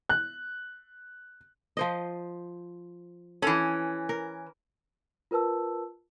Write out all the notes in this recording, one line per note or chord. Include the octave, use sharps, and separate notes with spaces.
F#6
F3 C5 D#5
E3 C#4 A4
A#4
F4 A#4 B4 A5 E6